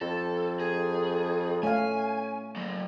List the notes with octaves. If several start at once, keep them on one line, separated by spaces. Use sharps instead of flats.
F2 A4
G#4
A3 C#4 F5 G#5
F#3 A#3